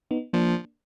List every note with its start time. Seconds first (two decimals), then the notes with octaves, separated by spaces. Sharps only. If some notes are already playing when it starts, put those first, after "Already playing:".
0.11 B3 D#4
0.33 F3 A#3 D4